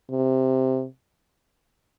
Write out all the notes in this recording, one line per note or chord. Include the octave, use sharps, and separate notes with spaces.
C3